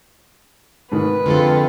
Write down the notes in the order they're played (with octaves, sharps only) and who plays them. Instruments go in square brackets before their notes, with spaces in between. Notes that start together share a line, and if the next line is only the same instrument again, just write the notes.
[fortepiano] G#2 D#3 [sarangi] B4
[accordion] F2 C4 F4 [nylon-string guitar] D3 G#3 A4